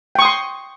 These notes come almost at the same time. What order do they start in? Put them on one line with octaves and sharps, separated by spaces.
G5 C#6 D#6 C6